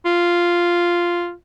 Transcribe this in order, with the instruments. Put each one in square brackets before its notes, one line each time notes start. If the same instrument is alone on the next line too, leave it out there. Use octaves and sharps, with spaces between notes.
[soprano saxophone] F4